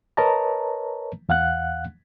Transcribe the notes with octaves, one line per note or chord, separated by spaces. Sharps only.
A#4 B4 C#5 D#5 A5 A#5
E2 F5 F#5 F#6